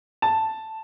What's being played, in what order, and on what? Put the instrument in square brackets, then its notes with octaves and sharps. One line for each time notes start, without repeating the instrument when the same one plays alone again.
[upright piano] A5